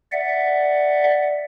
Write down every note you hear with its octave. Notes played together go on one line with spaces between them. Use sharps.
D5 E5 F#5